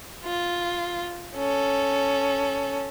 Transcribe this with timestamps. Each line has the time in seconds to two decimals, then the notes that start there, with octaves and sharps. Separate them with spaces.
0.24 F4
1.35 C#4 A4